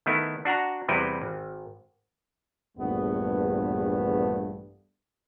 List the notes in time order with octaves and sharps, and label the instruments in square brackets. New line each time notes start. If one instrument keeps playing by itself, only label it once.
[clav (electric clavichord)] D#3 A3 B3 E4
D4 F#4 F#5 A#5
E2 C3 G3 E4 B4 G5
G#1
[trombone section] A#1 E2 G2 A3 B3